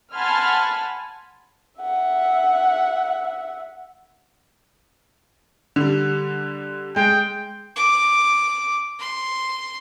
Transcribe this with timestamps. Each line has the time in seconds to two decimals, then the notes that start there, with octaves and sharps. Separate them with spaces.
0.13 F#5 G#5 A5 B5 C6 F6
1.81 E5 F#5
5.76 D3 G3
6.96 G#3 G5
7.76 D6
8.99 C6